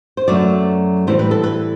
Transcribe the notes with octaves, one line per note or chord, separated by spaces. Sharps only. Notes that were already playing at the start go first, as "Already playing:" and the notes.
C5
F#2 F#3 A3 D5
A2 E3 G3 C5
B4
A4
B4